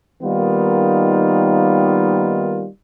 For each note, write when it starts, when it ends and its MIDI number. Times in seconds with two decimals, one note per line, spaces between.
0.22 2.66 51
0.22 2.66 55
0.22 2.66 58
0.22 2.66 59
0.22 2.66 63
0.22 2.66 65